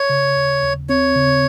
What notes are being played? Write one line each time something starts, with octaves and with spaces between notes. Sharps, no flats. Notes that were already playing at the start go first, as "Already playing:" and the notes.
Already playing: C#5
C#3
D#2
D#2
C4 C#5
C#3